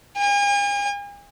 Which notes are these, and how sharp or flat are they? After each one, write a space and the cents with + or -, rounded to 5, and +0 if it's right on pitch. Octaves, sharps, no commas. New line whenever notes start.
G#5 -45